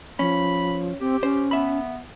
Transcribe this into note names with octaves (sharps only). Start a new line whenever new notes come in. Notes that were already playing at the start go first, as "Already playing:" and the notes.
F3 C#4 B5
C4 G4
C#4 C5
B3 E5 B5